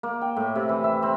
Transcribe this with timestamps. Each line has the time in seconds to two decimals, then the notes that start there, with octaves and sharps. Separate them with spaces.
0.03 A#3
0.22 G5
0.36 A2
0.56 C3
0.69 E3
0.84 E5
1.03 C4